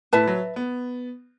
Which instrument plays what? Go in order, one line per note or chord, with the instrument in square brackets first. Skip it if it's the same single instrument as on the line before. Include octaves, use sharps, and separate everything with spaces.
[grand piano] A2 [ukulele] B4 E5 A5
[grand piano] F#3
B3